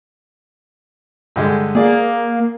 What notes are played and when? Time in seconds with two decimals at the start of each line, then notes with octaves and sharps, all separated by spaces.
1.36 G2 D3 G#3
1.75 A#3 G#4 D5